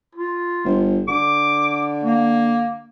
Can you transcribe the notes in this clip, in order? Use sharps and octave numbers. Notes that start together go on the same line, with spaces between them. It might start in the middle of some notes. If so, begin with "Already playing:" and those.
F4
G1
D3 D6
A#3